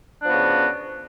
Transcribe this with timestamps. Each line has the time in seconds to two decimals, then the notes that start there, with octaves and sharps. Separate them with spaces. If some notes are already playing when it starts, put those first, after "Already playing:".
0.20 D4
0.23 F3
0.27 B3
0.30 F#4
0.34 C#3